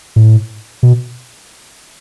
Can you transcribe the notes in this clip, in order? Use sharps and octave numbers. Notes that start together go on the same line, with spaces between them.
A2
B2